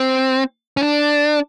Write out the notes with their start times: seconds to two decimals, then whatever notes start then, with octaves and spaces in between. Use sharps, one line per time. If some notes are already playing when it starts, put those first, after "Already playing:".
Already playing: C4
0.77 C#4
0.83 D4